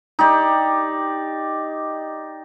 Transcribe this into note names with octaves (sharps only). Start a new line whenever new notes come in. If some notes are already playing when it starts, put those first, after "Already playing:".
D#4 G4 D5